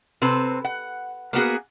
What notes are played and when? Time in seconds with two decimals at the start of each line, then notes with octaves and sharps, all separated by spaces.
0.22 C3 C4 A4 B4
0.65 F#5
1.33 A#3 B3 F#4 G#4